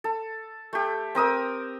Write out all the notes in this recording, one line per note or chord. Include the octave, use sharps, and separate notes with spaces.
A4
A3 G4
C4 A#4 D#6 E6